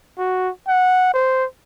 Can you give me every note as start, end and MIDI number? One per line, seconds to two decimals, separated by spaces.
0.18 0.50 66
0.67 1.11 78
1.13 1.45 72